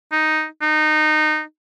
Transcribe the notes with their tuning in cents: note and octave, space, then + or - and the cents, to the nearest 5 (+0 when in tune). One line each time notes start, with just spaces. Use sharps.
D#4 +0
D#4 -20